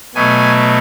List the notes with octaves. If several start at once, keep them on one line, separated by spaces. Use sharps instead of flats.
B2 F#3 A3 G#5